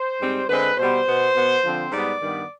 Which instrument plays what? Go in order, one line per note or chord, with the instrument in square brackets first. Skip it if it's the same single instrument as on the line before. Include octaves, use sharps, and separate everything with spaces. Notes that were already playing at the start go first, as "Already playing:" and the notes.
Already playing: [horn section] C5
G#2 G3 C4
D3 G#3 C4 B4
B2 G3 B3 C5
B2 B3
B2 B3
D3 F3 C4
G#2 G3 B3 D5
G2 D#3 G3 B3